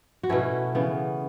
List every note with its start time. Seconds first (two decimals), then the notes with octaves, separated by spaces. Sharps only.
0.23 F#4
0.29 B2 A3 C#4 E4
0.75 C#3 E3 B3